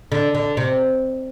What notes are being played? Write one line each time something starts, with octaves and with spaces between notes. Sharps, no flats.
D3
D3
C3